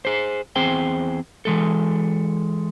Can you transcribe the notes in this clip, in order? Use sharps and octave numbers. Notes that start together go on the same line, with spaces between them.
G#4 C5
E2 C4 G#4 C5 G5
E3 G#3 A4